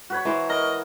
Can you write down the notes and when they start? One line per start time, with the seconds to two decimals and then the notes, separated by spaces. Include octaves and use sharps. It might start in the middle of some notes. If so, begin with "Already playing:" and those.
0.10 F#4 B4 C#5
0.25 E3 C5 A#5
0.49 A#4 D#5